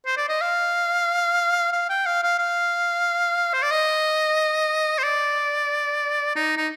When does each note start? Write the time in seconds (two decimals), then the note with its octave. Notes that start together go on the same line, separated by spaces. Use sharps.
0.06 C5
0.17 D5
0.29 D#5
0.41 F5
1.73 F5
1.90 G5
2.06 F5
2.23 F5
2.39 F5
3.53 C5
3.62 D5
3.71 D#5
4.98 C5
5.03 D5
6.36 D#4
6.57 D#4